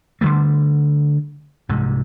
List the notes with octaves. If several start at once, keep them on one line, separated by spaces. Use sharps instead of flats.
D3 F3 G3 A3
C2 G#2 C3